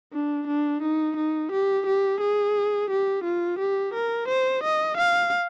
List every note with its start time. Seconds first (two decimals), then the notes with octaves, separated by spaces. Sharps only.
0.13 D4
0.48 D4
0.82 D#4
1.17 D#4
1.52 G4
1.86 G4
2.21 G#4
2.90 G4
3.24 F4
3.59 G4
3.94 A#4
4.28 C5
4.64 D#5
4.97 F5